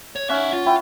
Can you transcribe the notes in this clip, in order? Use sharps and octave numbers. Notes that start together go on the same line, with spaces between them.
C#5
C#4 D#4 E5 F#5
F4
E4 G5